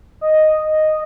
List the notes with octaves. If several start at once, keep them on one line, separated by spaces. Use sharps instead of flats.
D#5